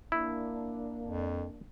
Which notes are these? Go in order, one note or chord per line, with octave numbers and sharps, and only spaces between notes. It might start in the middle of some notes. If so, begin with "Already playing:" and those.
A#3 D4 E4
F2